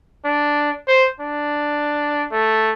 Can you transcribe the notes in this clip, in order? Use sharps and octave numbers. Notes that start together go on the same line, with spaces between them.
D4
C5
D4
A3